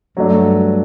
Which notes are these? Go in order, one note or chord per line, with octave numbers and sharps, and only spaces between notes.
G2 F#3 A3 D4